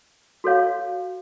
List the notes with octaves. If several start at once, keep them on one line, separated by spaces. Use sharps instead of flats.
F#4 A4 C#5 F5